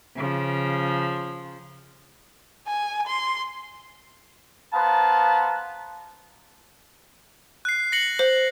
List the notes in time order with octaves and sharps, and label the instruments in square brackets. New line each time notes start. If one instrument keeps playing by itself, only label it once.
[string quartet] C#3 F3
[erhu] G#5
C6
[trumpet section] B3 B4 C5 F5 A5 A#5
[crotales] F#6 C7
A#6 C#7 F#7
[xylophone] C5